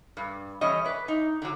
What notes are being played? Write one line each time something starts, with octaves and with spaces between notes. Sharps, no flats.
G2
E3 G3 C#4 C#5 D#5
B4 D5
D#4
D3 F#3